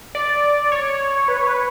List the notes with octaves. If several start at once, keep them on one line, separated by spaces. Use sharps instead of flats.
D5
C#5
B4
C#5
B4